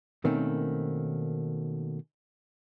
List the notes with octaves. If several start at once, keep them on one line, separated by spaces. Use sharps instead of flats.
B2 D#3 A3 A#3 C4 C#4